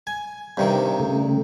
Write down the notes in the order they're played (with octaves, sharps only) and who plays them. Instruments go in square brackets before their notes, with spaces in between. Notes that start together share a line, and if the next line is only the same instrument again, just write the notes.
[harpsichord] G#5
[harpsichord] G2 C3 D#3 [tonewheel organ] C4
[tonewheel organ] C#3 A3